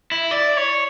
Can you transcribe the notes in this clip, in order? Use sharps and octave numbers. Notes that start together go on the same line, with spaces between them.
E4
D5
C#5